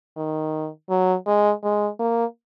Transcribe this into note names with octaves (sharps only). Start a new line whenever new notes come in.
D#3
F#3
G#3
G#3
A#3